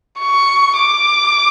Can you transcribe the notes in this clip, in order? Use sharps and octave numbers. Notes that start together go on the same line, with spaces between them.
C#6
D6